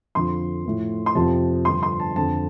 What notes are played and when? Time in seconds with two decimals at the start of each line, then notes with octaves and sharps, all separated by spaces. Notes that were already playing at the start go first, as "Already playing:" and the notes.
0.15 F2 D3 F3 C6
0.65 A2 F3
1.06 C6
1.15 F2 C3 F3 A5
1.65 G2 D3 F3 C6
1.83 C6
2.00 A5
2.16 F2 D3 F3 A5